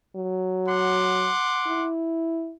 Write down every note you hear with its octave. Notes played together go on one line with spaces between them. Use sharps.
F#3
F#5 C6 D6
E4